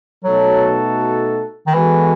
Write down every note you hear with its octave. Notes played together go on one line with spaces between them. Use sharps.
B2 F#3 A3 D#4 F#4 A4
D#3
E3 G#3 B3 F#4 A4